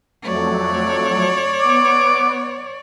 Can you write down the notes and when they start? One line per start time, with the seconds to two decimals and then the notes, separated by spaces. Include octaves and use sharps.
0.23 F2 F#3 A3 C#5 D5
1.62 B3 D6